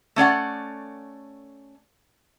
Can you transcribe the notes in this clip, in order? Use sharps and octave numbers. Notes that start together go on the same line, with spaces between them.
A3 C#4 D5 F#5